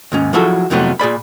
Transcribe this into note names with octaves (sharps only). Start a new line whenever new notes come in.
D#2 G#2 C#4
F3 F#3 E4 F#4 G#4 A4
F2 C3 E3 F#3 A3 B3
A#2 G#4 D5 B5